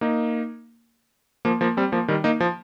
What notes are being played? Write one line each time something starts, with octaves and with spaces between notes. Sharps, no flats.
A#3 D#4
F3 A#3
F3 A#3
G3 C4
F3 A#3
D#3 G3
A#3 D#4
F3